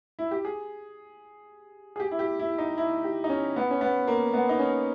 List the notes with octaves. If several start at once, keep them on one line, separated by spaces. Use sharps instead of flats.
E4
G4
G#4
G#4
G4
E4
G4
E4
D#4
E4
G4
D#4
C#4
B3
C#4
B3
A#3
B3
D#4
C#4